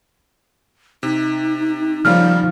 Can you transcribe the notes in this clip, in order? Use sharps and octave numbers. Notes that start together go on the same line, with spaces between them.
C3 D#4
C#3 F3 G3 A#3 F6